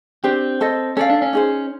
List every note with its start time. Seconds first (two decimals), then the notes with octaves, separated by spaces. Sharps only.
0.24 C4 D4 G4 C5
0.61 A4 C5 D#5
0.97 C#4 A4 D5 F5
1.10 D4
1.22 C#4
1.33 D#4 G#4 C5